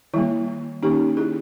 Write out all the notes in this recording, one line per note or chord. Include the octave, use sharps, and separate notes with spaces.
D#3 G3 A#3 E4
D#3 A#3 C#4 D#4 G4
E4 G#4